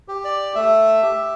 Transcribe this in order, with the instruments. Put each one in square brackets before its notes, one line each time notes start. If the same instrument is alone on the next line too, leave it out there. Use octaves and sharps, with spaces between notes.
[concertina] G4
D5
A3 E5
G4